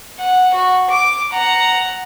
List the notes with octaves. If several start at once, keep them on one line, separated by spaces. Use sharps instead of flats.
F#5
F#4
D6
F#5 A#5